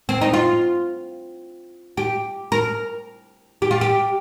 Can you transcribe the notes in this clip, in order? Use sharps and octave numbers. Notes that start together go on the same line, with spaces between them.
C4
D#4
F4
G4
A#4
G4
F4
G4